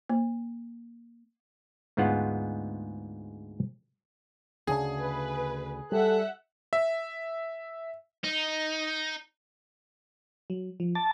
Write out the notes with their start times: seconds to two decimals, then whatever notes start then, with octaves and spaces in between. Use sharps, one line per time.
0.10 A#3
1.97 D2 G#2 G#3 B3 F4 F#5
4.67 D2 C#3 D4 G#4
4.99 B4
5.92 G3 A4 E5 F#5 F#6
6.73 E5
8.24 D#4
10.50 F#3
10.80 F3
10.95 A5 D6